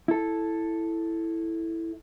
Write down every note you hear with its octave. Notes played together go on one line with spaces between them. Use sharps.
E4 A4